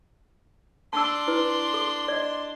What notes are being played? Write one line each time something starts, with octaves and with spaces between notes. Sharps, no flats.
D4 A5 C6 E6
E4 B4
A4
D5 D#5